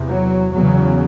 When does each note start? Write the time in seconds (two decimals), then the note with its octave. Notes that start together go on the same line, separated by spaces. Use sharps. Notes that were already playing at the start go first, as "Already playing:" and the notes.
Already playing: E2 C3
0.08 F#3
0.53 E2 C#3 F#3